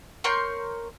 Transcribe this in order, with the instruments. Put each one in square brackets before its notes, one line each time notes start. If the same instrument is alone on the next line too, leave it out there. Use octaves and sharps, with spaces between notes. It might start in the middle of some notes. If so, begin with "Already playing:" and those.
[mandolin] A#4 C#5 C6 G6